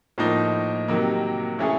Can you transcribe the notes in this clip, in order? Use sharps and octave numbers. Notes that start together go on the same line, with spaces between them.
A2 F3 A#3 D#4
C3 D#3 F#3 A#3
E3 A3 C#4 E4 G#4